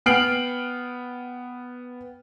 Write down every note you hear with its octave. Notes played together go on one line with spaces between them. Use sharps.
B3 G5 F6 C7 D7 F#7